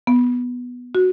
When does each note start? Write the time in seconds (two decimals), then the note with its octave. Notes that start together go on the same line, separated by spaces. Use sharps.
0.07 B3
0.95 F#4